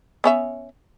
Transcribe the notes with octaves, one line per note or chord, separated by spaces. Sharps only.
B3 C#4 E5